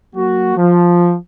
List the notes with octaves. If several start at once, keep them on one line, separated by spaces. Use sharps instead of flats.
F#3 A#3 F#4
F3